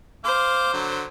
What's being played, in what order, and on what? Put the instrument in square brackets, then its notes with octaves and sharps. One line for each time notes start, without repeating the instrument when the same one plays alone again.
[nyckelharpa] C5 [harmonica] F5 D6
[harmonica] D3 F#3